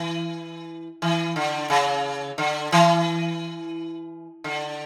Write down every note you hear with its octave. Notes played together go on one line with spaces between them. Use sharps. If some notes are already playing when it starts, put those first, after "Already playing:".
Already playing: E3
E3
D3
C#3
D3
E3
D3